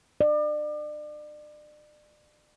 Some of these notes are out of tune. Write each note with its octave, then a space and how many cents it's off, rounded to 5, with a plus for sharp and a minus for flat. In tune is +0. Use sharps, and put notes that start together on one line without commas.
D5 +35